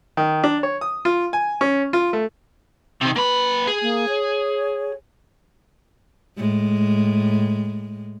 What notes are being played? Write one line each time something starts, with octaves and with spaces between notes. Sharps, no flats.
D#3
D4
C#5
D#6
F4
G#5
C#4
F4
A3
C3 D#3 C4
A#3 B4 B5
G#4
A#3
C#5
A2 G#3